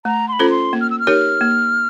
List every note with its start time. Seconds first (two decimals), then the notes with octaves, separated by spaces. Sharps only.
0.05 A3 A#5
0.28 C6
0.33 B5
0.39 C#4 F4 A4 C5
0.50 C6
0.73 A#3
0.81 F6
0.90 E6
1.00 F6
1.07 D#4 G4 A#4 C#5
1.41 A#3